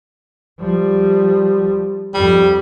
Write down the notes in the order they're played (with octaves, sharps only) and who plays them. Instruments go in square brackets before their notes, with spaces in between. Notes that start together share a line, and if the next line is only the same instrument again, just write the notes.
[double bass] F3 G3
[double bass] F2 [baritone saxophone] G3